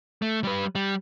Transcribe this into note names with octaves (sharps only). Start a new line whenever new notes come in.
A3
G3 B4
G3